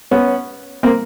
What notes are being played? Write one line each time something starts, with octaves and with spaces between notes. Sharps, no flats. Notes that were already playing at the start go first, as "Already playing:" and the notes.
B3 C#4
A#3 C4